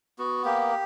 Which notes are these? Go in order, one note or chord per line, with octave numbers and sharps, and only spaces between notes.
B3 F#4
A#3 G4